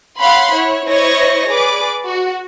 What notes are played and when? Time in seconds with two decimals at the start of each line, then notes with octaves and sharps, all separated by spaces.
0.19 C#5 F5 F#5 B5 C6
0.54 E4 C#5
0.87 E4 C5 C#5 D#5 C#6 A#6
1.48 G#4 B4 D5 D6
2.05 F#4